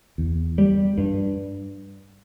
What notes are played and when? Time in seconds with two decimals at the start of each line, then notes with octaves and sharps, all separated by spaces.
0.18 E2
0.58 G3
0.98 G2